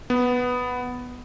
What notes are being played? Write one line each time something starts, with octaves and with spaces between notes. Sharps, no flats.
B3